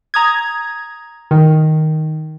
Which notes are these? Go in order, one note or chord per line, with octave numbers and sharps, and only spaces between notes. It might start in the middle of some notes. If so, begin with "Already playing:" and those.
A#5 D#6 G#6
D#3